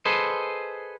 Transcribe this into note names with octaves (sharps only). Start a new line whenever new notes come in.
G#4 A4 B4 C5 D#5